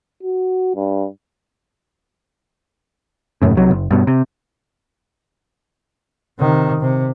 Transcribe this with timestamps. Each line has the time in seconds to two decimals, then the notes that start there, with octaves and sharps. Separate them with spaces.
0.23 F#4
0.75 G2
3.42 E1 F#2 A2 C#3
3.57 C2 C3 F#3
3.71 F#1
3.91 G2 B2
4.07 C3
6.39 C3 D#3
6.81 C3